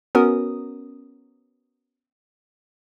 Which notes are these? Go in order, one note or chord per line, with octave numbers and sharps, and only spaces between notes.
B3 C#4 F#4 A#4 D#6